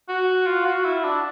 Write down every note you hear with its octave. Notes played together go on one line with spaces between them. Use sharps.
F#4
F4
F#4
E4
D4